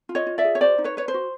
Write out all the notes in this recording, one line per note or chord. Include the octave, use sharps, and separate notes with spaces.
F4
C#5 D#5
F4
D5 E5
G#4
C#5
F#4 C5 D5
D#4
B4 C#5
B4 C#5
C5
F#4